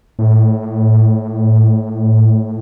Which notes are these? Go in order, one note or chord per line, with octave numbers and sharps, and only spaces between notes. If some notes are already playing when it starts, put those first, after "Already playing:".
A2